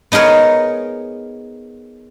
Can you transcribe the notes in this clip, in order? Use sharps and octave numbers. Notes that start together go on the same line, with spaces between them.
B3 D#4 G#4 A#4 C#5